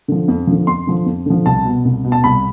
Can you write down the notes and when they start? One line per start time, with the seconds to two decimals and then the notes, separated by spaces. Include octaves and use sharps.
0.08 D3 F3
0.28 F2
0.47 D3 F3
0.67 F2 C6
0.87 D3 F3
1.06 F2
1.26 D3 F3
1.46 C2 A5
1.65 B2
1.85 C2
2.05 B2
2.12 A5
2.24 C2 B5